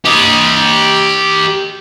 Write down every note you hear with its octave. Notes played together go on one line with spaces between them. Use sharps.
G4 D#5